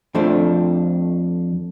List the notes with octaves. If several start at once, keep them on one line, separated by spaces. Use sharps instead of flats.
F2 F3 A3 C4 D4